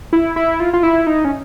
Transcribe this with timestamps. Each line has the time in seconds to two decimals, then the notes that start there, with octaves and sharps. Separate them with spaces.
0.13 E4
0.36 E4
0.60 F4
0.73 F4
0.83 E4
1.07 D#4
1.25 C#4